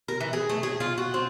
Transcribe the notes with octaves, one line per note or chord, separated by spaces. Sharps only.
A#4
E3
G#4
A3
G#4
F4
F#4
C4